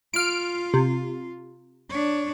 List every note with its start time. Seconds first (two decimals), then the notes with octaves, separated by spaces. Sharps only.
0.14 F4 F6 D7
0.74 C3
1.90 D4 C#5